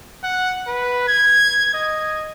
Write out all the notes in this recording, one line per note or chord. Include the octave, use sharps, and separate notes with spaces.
F#5
B4
G#6
D#5